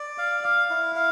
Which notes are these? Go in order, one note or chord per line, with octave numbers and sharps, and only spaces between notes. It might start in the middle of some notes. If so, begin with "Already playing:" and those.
Already playing: D5
F5
F5
E4
F5